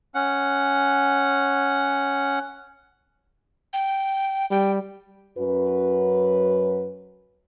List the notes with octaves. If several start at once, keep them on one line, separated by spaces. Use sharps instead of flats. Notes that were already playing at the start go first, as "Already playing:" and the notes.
C#4 F#5
G5
G3 G5
F#2 F#3 C#4 F#4 B4